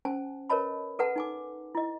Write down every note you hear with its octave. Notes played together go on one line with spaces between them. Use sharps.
C#4 C5 G#5 A5
A#4 B4 C#5 D#5 A5 B5
A4 B4 F#5 A5
D#4 G#5 D6
E4 D#5